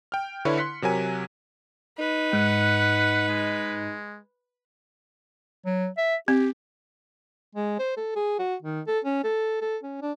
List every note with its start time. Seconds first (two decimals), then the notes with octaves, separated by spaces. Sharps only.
0.12 G5 F6
0.45 D3 E4 B4 C#5
0.57 C6 F#6 B6 C#7
0.82 C3 F#3 A#4 G#5
1.99 D#4 B4
2.33 G#2 F#5
3.28 G#3
5.66 F#3
5.98 E5
6.28 C4 G4
7.55 G#3
7.79 C5
7.97 A4
8.16 G#4
8.39 F#4
8.62 D#3
8.87 A4
9.05 C#4
9.24 A4
9.62 A4
9.83 C#4
10.02 D4